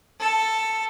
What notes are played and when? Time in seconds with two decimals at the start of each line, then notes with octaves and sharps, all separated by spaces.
0.20 A4